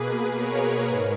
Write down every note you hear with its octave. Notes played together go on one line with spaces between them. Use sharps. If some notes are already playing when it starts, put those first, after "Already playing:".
Already playing: B2 A#3 G#4 B4
A#4 C#5
G#2